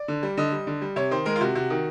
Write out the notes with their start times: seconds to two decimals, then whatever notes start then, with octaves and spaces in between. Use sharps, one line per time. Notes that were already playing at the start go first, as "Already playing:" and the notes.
Already playing: D5
0.08 D3
0.23 G3
0.37 D3 D#5
0.52 G3
0.67 D3
0.82 G3
0.96 C3 C#5
1.11 D#3 C5
1.26 G#3 A#4
1.36 F4
1.41 C3 F#4
1.55 C3 F#4
1.70 D#3